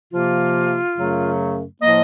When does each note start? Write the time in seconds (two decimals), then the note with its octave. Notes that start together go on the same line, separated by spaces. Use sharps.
0.12 C3 F3 A#3 F4
0.97 F#2 C#3 F#3 A3
1.82 A2 F3 A#3 D#5